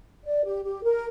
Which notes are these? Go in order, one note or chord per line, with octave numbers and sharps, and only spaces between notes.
D5
G4
G4
A#4